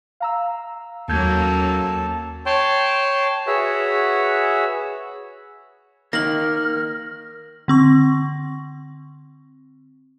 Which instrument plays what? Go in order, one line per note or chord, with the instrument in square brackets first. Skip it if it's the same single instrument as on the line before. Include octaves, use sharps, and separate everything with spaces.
[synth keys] F5 A#5 E6
[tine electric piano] D#2 G6 G#6 [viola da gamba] F#3 A#3 C#4 [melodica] A4 A5
[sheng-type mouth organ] C#5 G5 A5 C6
F#4 G#4 B4 C#5 E5 F#5
[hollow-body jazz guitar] D#3 A#3 [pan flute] F6 [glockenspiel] A#6 F#7
[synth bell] D3 C4 C#6